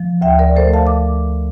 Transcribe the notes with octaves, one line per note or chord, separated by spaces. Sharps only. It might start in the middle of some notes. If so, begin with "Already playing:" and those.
Already playing: F3
D2 E5 G5
A#4 D5
A3 A4 C5
F5 A5
D6